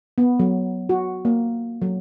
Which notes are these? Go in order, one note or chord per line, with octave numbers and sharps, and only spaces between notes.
B3
F#3
F#4
A#3
F#3